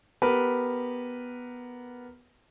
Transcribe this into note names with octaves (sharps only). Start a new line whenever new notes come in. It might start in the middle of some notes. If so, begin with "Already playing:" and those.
B3 G4 A#4 B4